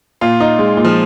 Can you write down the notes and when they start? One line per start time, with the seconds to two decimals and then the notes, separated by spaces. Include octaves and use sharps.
0.21 A#2 F4
0.40 D#4
0.59 G#3
0.77 A#2
0.85 F3